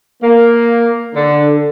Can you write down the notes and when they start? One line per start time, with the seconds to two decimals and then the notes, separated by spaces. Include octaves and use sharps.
0.23 A#3
1.15 D3